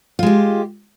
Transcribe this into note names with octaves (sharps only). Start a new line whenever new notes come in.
G#3 F4 G4